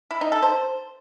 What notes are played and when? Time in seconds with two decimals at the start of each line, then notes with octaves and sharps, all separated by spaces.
0.11 E4
0.21 D#4
0.32 A4
0.42 C5